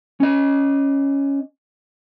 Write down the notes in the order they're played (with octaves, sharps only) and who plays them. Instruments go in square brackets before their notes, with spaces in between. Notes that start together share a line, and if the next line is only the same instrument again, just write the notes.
[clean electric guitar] C#4 D#5